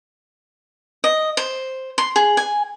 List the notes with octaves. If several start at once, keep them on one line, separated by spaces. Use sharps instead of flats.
D#5
C5
C6
G#4
G#5